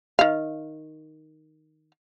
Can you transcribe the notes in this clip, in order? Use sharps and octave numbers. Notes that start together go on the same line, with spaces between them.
D#3 F5